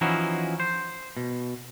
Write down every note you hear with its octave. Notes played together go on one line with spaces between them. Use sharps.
E3 F3 C#4 D#4 E4 F#4
C5
B2